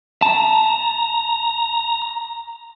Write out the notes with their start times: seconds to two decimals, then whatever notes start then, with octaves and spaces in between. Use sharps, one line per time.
0.22 A5 A#5